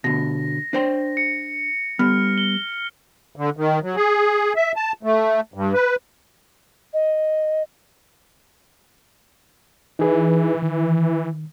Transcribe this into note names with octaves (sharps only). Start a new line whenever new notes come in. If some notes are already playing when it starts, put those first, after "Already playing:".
B2 D3 A#6
D4 C5 G5
C#7
G3 B3 F6
G7
D3
D#3
F#3
G#4
E5
A5
A3
G2
B4
D#5
E3 D#4 G#4 B4
D#3